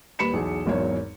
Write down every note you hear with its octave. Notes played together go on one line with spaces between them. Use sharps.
D#2 G3 B4 B5 C#7 E7
B1 E2 G#4
G#1 E2 F#3 A#4 C#5